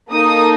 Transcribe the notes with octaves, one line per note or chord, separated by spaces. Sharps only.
A#3 D#4 A4 D#6